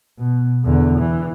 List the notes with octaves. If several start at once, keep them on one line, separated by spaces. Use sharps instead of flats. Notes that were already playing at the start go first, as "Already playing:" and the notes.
B2
E2 D3
E3